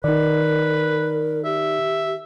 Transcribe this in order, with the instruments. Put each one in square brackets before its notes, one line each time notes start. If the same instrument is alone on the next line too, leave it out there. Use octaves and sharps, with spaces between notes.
[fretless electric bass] D#3 [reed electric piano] D#4 D5 [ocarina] A#4 [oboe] B4
[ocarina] G4 [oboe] E5